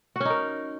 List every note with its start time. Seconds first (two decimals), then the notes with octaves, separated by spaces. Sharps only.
0.16 F#4
0.20 C#4
0.25 D#4
0.30 A#4